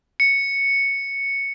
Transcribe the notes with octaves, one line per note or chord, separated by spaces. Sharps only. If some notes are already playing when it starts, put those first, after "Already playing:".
C#7